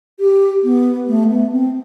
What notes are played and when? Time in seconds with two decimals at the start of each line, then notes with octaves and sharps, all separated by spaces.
0.20 G4
0.64 B3
1.08 A3
1.30 B3
1.52 C4